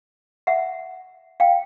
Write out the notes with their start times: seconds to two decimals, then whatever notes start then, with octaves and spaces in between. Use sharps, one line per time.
0.47 E5 F#5
1.40 F5 G5